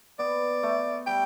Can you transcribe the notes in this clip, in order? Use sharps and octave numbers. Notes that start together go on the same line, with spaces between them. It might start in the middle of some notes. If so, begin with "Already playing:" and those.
B3 D5
A3
G3 G5